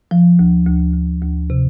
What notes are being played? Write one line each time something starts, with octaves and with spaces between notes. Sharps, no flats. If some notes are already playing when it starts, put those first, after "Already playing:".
F3
D2
D2
D2
D2
C3